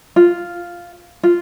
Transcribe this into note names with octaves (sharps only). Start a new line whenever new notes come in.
F4
F4